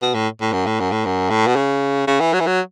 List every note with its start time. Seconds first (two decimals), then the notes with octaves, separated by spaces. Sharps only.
0.02 B2
0.14 A2
0.41 A2
0.53 F#2
0.66 A2
0.80 F#2
0.91 A2
1.05 F#2
1.30 A2
1.47 B2
1.56 C#3
2.07 C#3
2.20 E3
2.33 F#3
2.40 E3
2.47 F#3